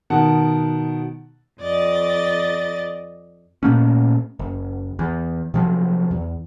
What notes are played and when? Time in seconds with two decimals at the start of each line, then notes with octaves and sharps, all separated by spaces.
0.10 B2 D#3 F#5 A5
1.59 F2 D5 D#5 A6
3.63 A#2 A3 A#3 C#4
4.39 F#1
4.99 E2
5.54 C3 F3 F#3
6.11 E2